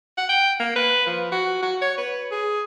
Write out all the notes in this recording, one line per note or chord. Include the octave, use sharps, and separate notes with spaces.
F#5
G5
A#3
B4
F3
F#4
F#4
C#5
B4
G#4